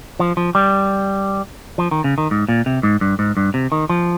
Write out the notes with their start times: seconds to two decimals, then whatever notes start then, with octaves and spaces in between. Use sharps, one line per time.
0.20 F3
0.37 F3
0.55 G3
1.78 F3
1.91 D#3
2.04 C#3
2.18 D#3
2.31 G#2
2.48 A#2
2.66 C3
2.83 G#2
3.01 G2
3.19 G#2
3.37 G2
3.54 C3
3.72 D#3
3.89 F3